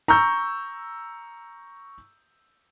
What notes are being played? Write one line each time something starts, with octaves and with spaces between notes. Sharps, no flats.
A#5 C#6 E6 G6